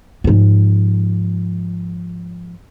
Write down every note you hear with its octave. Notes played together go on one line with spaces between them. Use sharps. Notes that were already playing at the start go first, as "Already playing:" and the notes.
G#2 F3